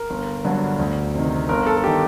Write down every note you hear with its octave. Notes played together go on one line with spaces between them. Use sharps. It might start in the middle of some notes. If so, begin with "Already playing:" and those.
Already playing: A#4
G1
G2 D3 F#3
D2
C3 D#3
G1 A#4
A4
A4
D#3 G4